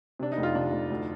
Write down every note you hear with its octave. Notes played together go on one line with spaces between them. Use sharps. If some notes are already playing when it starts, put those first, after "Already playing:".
C3 D4
D#4
F1
F4
C3 D4
F1
D2